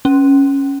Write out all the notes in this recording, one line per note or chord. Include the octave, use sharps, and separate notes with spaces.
C#4